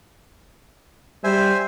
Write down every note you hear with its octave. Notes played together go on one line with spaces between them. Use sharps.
G3 C5 E5 G#5